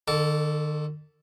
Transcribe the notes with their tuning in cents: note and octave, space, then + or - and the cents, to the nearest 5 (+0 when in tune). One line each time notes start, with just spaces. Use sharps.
D#3 -45 A4 +0 D6 -35